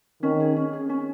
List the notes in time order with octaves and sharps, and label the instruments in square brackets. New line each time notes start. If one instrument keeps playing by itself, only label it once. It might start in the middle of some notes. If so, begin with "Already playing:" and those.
[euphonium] D#3 [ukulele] C#4
[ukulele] G#4
C#4
G#4
C#4